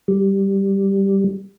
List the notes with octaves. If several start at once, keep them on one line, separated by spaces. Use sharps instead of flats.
G3